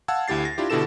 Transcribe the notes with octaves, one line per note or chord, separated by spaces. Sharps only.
F5 F#5 A5 E6 G#6
D2 E4 G4 A6 C7
A#6
D4 E4 F4 G4
B2 D3 E4 G4 A4 E7